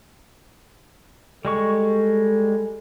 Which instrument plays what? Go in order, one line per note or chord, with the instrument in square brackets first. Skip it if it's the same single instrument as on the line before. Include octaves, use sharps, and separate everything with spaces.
[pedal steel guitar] G3 G#3 C#6 [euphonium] A4